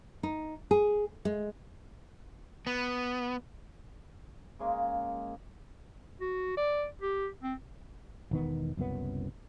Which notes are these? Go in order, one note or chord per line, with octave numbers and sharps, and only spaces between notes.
D#4
G#4
G#3
B3
C#3 G#3 A#3
F#4
D5
G4
C4
E1 D#3 B3
F#1 C2 F#2 B3